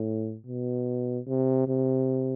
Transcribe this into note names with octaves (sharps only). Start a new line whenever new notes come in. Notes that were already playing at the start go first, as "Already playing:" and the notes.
Already playing: A2
B2
C3
C3